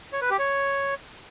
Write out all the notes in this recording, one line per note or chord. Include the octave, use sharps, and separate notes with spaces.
C#5
B4
G4
C#5